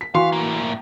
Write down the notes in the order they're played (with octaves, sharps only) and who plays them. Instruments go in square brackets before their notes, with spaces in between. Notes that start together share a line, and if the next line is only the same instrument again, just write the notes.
[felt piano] B6
[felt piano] E3 F#4 C6 [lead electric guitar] F5
[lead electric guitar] A2 A#3